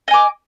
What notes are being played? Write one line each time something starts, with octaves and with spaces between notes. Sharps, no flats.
D#5 G#5 D6